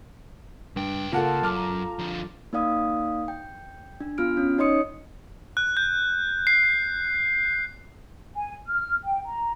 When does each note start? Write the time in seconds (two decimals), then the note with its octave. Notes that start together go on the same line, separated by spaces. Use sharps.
0.76 C#2 G2 G5
1.13 C#3 A#3 F4 A4 A#4 F#5 A5
1.43 F#2 D6 F6
1.56 A#5
1.99 D3 F3
2.53 A#3 D#4 D5 F5 D#6
3.28 G5
4.00 D4
4.18 B3 F4 F6 D7
4.37 C#4
4.58 D#4 C#5 D#5 C6 D#6 C#7
5.57 F#6
5.77 G6
6.47 C7
8.35 G#5
8.68 F6
9.04 G5
9.25 A#5